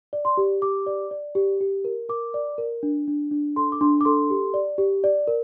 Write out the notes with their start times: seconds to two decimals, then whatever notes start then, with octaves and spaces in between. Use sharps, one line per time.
0.13 D5
0.25 C6
0.37 G4
0.62 G4 D6
0.87 D5
1.11 D5
1.35 G4
1.61 G4
1.85 A#4
2.09 A#4 D6
2.34 D5
2.58 A#4
2.83 D4
3.08 D4
3.31 D4
3.56 A4 C6
3.72 D6
3.81 D4 C6
4.01 D6
4.05 A4 C6
4.30 G4
4.54 D5
4.78 G4
5.04 D5
5.27 A#4